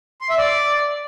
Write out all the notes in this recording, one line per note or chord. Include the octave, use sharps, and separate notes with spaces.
C6
E5
D5